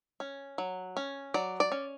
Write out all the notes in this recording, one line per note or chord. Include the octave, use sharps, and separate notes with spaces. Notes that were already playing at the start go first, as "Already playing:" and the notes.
C#4
F#3
C#4
F#3 D5
D5
C#4